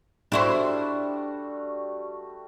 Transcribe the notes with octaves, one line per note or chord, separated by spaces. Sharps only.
G3 A3 D4 E4 F#4 C5